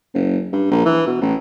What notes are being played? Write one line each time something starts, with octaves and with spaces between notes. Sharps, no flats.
F#1
G2
A#1
E3
B2
A1